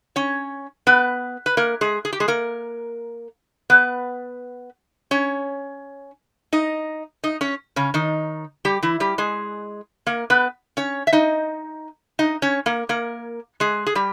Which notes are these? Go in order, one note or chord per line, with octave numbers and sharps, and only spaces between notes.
C#4 C#5
B3 B4
B4
A#3 A#4
G#3 G#4
G#4
G4
G#3 G#4
A#3 A#4
B3 B4
C#4 C#5
D#4 D#5
D#4 D#5
C#4 C#5
C#3 C#4
D#3 D#4
G3 G4
E3 E4
G3 G4
G#3 G#4
A#3 A#4
B3 B4
C#4 C#5
E5
D#4 D#5
D#4 D#5
C#4 C#5
A#3 A#4
A#3 A#4
G#3 G#4
G#4
G3 G4